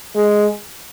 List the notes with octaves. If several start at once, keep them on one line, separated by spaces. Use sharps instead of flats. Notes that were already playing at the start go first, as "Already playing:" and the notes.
G#3